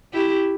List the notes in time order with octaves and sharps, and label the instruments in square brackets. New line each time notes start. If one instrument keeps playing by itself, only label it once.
[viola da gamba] E4 G4